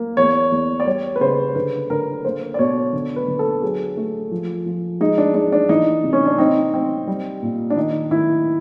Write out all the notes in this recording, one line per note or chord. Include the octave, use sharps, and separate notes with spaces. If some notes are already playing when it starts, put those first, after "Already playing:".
Already playing: A#3
E2 C#5
E2
D5
G3 C#5
B4
C#3 C5
D3 B4
D3 A#4
A#3 C5
D5
B2 C#5
D3
B4
D3
A4
F#3 G#4
A3
F3
F3
G#3 D#4
D4
G#3 D4
D4
E3 D#4
C3
C#4
D4
C4 D#4
C4
G3
A#2
D4
D#3 D#4
D#3 E4